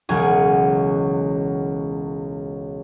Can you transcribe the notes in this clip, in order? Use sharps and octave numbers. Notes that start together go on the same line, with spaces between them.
E1 C#2 F#3 F#5 G#5